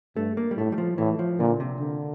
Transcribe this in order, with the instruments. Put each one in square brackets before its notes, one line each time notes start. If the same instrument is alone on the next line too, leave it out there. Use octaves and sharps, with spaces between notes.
[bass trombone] G2 [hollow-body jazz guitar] A3
[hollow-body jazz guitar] A#3
G3
[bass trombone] A2 [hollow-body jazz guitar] A3
[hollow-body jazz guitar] G3
F3
[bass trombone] A2 [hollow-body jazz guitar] E3
[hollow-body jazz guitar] F3
[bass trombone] A#2 [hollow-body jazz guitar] D3
[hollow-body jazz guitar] C3
[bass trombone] D3